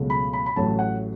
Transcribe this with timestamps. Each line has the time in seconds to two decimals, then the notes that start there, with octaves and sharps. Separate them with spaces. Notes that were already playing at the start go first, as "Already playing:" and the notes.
Already playing: C#2 B2 F#3 A3
0.10 B5
0.33 B5
0.46 B5
0.56 A1 A2 F#3 A3 A5
0.79 F#5